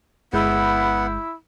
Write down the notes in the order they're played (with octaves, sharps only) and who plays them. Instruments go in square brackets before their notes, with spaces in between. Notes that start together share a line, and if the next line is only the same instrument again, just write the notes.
[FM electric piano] G1 G#3 G6 [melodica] B3 F#5 [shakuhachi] E4